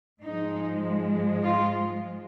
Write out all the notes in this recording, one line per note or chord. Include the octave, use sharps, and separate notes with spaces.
G#2 F3 G#3 D#4
F4